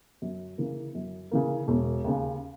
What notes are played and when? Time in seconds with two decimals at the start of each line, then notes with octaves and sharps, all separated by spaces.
0.22 F#2
0.58 C#3 E3 A#3
0.95 F#2
1.31 C#3 E3 A#3
1.68 E1
2.04 D#2 C#3